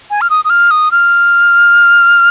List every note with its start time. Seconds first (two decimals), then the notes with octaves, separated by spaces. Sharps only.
0.10 G#5
0.21 F6
0.30 D#6
0.45 D#6
0.50 F6
0.71 D#6
0.92 F6